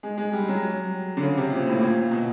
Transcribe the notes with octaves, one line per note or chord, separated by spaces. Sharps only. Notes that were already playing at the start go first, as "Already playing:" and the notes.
G#3
G#3
G3
F#3
D3
C#3
C3
A#2
A2
A#2
B2